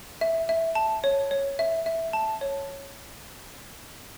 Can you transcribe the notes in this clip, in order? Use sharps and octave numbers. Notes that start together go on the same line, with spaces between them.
E5
E5
A5
C#5
C#5
E5
E5
A5
C#5